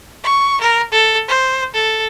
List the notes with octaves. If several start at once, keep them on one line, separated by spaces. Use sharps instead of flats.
C#6
A#4
A4
C5
A4